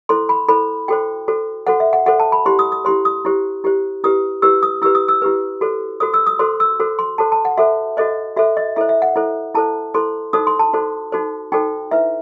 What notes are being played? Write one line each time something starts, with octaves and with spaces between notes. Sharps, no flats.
E4 A4 C5 C6
B5
E4 A4 C5 B5
F#4 A4 C5 G5
F#4 A4 C5
F#4 A4 C5 F#5
E5
F#5
F#4 A4 C5 F#5
A5
B5
E4 G4 C5 C6
D#6
D#6
E4 G4 C5 C6
D#6
E4 G4 C5
E4 G4 C5
E4 G4 B4 D#6
E4 G4 B4 E6
D#6
E4 G4 B4 E6
D#6
E6
E4 G4 B4
F#4 A4 C5
F#4 A4 C5 D#6
E6
D#6
F#4 A4 C5 C6
E6
F#4 A4 C5
C6
F#4 A4 C5 A5
A5
F#5
F#4 A4 C5 E5
F#4 A4 C5 D#5
F#4 A4 C5 E5
D#5
E4 A4 C5 E5
E5
F#5
E4 A4 C5
E4 A4 C5 A5
E4 A4 C5 C6
D#4 F#4 A4 C5 D#6
C6
A5
D#4 F#4 A4 C5
D#4 F#4 A4 C5
D#4 F#4 A4 C5 G5
E4 B4 E5